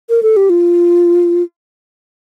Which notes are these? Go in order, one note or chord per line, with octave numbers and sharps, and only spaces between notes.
A#4
A4
G4
F4